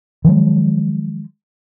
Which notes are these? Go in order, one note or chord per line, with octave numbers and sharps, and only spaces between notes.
D#3 F3 F#3 G#3